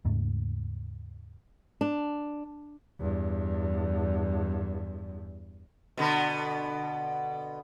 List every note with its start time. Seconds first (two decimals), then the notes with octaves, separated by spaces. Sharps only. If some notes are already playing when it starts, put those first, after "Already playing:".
0.05 D#2 G#2 C#3 A3
1.81 D4
3.00 E2 G2
5.97 B2 D3 B3